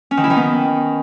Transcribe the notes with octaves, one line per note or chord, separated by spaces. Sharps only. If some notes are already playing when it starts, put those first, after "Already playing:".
C#4
D#3
E4
D#3
B3